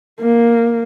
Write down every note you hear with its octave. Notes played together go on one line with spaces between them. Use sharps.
A#3